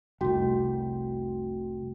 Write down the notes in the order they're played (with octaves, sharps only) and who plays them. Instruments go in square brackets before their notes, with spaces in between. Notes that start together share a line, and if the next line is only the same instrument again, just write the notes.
[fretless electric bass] F1 C2 [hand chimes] A3 F#4 G5